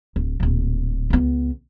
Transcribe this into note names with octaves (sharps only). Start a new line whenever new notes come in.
D1
D1 A#2
C#2 B3